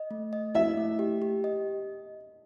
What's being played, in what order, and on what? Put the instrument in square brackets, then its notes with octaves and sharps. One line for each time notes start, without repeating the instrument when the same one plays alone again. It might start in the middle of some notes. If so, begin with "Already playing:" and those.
Already playing: [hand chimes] D#5
A3
D#5
[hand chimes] E4 [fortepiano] E5
[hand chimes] A3
G4
G4
D#5